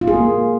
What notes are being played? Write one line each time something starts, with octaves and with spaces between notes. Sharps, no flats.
F4
G#4
A#3